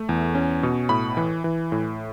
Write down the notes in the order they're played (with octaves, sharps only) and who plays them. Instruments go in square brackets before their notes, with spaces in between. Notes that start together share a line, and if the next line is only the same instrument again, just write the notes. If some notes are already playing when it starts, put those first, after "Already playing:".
Already playing: [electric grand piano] A3
E2
C#4
B2
A2 B5
E3
E3
A2